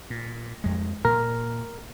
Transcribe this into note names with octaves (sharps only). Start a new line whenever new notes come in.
A#2
F2 G#3
A#2 A#4